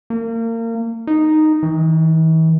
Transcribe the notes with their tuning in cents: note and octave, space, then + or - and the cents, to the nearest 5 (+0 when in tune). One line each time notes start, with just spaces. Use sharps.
A#3 -30
D#4 -5
E3 -45